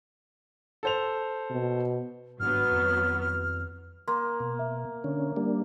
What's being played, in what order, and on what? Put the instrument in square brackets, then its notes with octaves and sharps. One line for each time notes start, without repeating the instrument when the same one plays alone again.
[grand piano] A4 C5 F7
[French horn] B2
[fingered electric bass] G1 G#2 D4 [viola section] F#3 B3 [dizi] F6
[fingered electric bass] F2 D#3
[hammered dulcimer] A#3 [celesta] C6
[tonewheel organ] B2
[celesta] E5
[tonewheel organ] D3 C#4
G3 A#3 D4